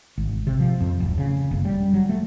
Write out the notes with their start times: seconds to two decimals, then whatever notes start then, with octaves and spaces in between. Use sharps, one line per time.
0.18 G#1
0.47 C3
0.60 F3
0.80 F2
1.00 D1
1.18 C#3
1.51 F#1
1.65 G3
1.94 F#3
2.09 A3